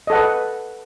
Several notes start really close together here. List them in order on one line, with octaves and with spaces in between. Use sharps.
D#5 A4 F#5 B4